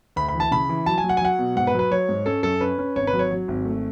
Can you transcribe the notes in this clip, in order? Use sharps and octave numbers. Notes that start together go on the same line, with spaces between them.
D2 B5
B5
E3
A5
C#3 B5
E3
F#3 A5
G#5
F#3
F#5
G#5
F#3 F#5
B2
G#2 F#5
B4
F#3
B4
F#3 C#5
G#2
C#4 A4
F#2 A4
C#4 B4
C#4
G#1 C#5
B4
F#3
C#5
F#3
G#1
A3